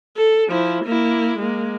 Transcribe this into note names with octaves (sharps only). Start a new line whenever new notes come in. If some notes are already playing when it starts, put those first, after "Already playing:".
A4
F3 E4
A#3 E4
G#3 A#3